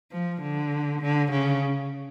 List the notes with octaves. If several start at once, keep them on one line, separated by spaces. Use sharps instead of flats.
F3
D3
D3
C#3